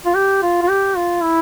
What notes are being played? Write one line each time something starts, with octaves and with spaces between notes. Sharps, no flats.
F4
G4
F4
F4
G4
F4
E4